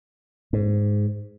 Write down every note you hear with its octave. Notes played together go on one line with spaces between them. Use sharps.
G#2